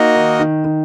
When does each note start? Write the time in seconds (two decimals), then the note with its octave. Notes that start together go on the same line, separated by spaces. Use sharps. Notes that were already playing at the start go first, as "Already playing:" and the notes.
Already playing: A#3 D#4 F#4 A#4 D#5
0.16 D#3
0.39 D#3
0.65 D#3